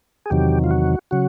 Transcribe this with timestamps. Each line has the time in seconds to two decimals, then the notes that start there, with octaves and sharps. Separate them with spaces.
0.26 G#4
0.30 E2 C3 D#3 F#3 G4
0.64 F4
0.71 F#4
1.11 C#3 F#3 F#4